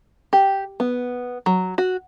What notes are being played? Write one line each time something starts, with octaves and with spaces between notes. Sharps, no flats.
G4
B3
F#3
F#4